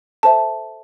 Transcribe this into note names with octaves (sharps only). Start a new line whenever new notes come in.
A4 C5 E5 A5